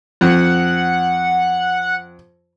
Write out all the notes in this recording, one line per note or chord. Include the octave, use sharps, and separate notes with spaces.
F2 F#5